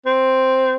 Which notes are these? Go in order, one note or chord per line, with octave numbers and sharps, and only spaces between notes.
C4